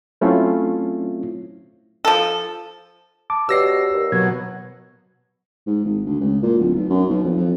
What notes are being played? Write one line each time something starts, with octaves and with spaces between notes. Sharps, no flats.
F#3 A3 C4 C#4 E4 F4
F3 A4
A5 D6
B2 G4 C#5 D5 E6 A#6 C7
D#2
B2 F#3 G#6
G#2
G#1
D2
C#2
A#2
D1
B1
F#2
B1
F2
F2